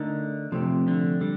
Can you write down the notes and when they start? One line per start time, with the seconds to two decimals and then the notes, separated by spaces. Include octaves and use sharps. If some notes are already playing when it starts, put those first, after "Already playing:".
Already playing: D3 A3 D#4 A#4
0.52 C3 F3 A3 C4 G4
0.88 D3
1.21 D3 G3